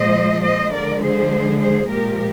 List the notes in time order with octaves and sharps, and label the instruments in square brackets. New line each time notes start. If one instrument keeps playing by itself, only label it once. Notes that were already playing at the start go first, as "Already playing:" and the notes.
Already playing: [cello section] A#2 F3 G#3 C5 D#5
C5 D#5
D3 F3 G#3 A#4 D5
G#4 C5
G#4 C5
A#2 F3 G#3 G4 A#4